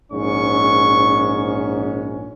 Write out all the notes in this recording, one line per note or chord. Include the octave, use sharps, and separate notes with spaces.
A#1 G#2 C#4 C#6